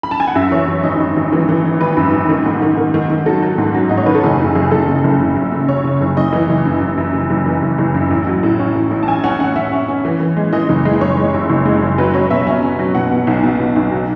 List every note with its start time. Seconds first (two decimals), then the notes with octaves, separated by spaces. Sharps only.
0.03 B5
0.11 A5
0.20 G#5
0.28 F#5
0.35 F#2 E5
0.51 E3 C#5
0.68 F#2
0.83 G#1 D#5
1.00 F#2
1.16 G#1
1.32 E3
1.49 E3
1.65 G#1
1.81 G#1 B4
1.97 F#2
2.13 G#1
2.29 D#3
2.45 G#2
2.62 D#3
2.77 D#3
2.94 D#3
3.10 D#3
3.26 F#3 A4
3.42 F#3
3.58 G#2
3.74 F#3
3.89 G#2 D#5
3.97 C#5
4.06 D#3 B4
4.15 A4
4.23 F#1 G#4
4.40 F#2
4.55 F#1 G#4
4.71 F#1 A4
4.88 C#3
5.04 F#1
5.20 C#3
5.36 F#2
5.52 C#3
5.69 C#3 C#5
5.84 C#3
6.01 F#1
6.17 F#1 D#5
6.33 E3
6.49 F#1
6.65 F#2
6.81 F#2
6.98 F#2
7.14 F#1
7.30 F#1
7.46 E3
7.62 F#1
7.78 F#1
7.95 F#2
8.11 A1
8.27 F#3
8.43 A2
8.59 C#4
8.75 A2
8.91 A1
9.03 A5
9.08 C#4 G#5
9.24 C#4 F#5
9.40 C#4 F#5
9.56 C#4 E5
9.72 C#4
9.88 C#4
10.05 E3
10.20 E3
10.37 G#3
10.53 E3 D#5
10.69 F#1
10.85 G#3
11.01 F#1 C#5
11.17 G#3
11.34 F#2
11.49 F#1
11.65 G#3
11.83 F#1
11.98 F#3 B4
12.14 F#3 C#5
12.30 B2 E5
12.47 C#4
12.63 C#4
12.79 F#3
12.95 B2 F#5
13.11 B2
13.27 B1
13.43 B2
13.59 B1
13.76 B1
13.91 F#3